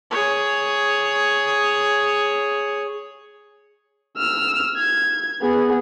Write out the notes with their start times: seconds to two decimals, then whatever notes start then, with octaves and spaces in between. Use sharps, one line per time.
0.11 G#4 C#5
4.18 E6 F6
4.77 G#6
5.42 B3 G#4